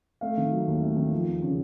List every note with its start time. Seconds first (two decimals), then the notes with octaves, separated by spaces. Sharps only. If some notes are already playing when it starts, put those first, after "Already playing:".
0.21 A3 F5
0.37 D#3
0.51 F#3
0.67 D#2
0.81 A3
0.97 D#3
1.11 F3
1.27 E2
1.42 C#3